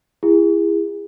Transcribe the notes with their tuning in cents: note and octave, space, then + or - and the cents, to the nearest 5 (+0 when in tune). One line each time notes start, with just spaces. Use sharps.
E4 +25 G#4 -30